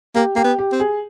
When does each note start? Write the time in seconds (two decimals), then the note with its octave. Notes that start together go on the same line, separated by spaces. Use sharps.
0.15 A#3 G4
0.36 A#3 G4
0.44 B3
0.59 G4
0.72 C4
0.80 G#4